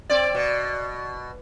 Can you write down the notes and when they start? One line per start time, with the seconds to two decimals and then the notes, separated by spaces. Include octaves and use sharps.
0.10 C4 D5
0.35 B2